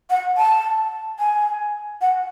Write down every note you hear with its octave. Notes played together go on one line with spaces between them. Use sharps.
F#5
A5
G#5
F#5